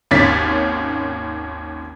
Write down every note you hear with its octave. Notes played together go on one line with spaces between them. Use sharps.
G#1 D#2 C#4 A6 B6